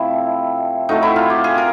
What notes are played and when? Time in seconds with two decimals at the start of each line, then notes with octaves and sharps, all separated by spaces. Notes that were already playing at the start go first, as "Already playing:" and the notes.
Already playing: C3 F3 A3 C4 E4
0.89 A2 F#3 A3 C4 D#4
1.03 E4
1.16 F4
1.30 G4
1.44 G#4
1.58 A#4